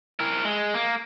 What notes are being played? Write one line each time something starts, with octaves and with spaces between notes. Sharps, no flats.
E4 A#4
G#3
A#3